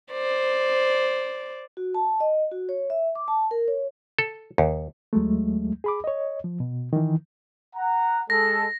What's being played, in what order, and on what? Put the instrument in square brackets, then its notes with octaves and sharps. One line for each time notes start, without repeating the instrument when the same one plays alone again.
[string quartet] C5 D5
[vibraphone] F#4
A5
D#5
F#4
C#5
E5
D6
A5
A#4
C#5
[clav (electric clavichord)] A4
D#2
[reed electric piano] D2 F#3 G#3 A3
G#4 B5 D6
C#5 D#5
F3
B2
D#3 E3
[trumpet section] F#5 A#5
[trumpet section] G#3 A4 [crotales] A#6